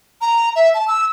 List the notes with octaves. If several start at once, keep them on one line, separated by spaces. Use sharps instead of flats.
A#5
E5
A5
E6